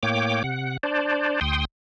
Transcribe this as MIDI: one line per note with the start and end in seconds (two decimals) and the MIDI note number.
0.03 0.43 45
0.03 0.43 58
0.03 0.43 73
0.03 0.43 79
0.03 0.43 86
0.44 0.77 48
0.44 0.77 78
0.83 1.40 62
0.83 1.40 72
0.83 1.40 74
1.41 1.65 38
1.41 1.65 79
1.41 1.65 84
1.41 1.65 87